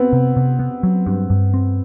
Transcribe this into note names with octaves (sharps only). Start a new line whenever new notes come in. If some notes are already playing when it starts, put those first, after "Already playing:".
Already playing: B3 C4
C3
C3
B3
F#3
G2
G2
C4